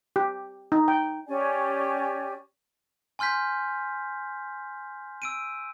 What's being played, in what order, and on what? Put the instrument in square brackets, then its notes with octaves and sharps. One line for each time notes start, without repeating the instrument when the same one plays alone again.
[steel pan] G4
D#4
G5
[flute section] C#4 G4 D5 G#5
[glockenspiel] G#5 C6 F6 G6 B6
E6 D7 D#7